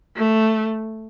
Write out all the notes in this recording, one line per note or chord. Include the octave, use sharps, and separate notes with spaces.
A3